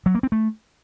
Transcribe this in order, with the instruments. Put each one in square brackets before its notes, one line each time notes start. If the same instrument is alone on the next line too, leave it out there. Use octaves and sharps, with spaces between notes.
[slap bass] F#3
A#3
C4
A3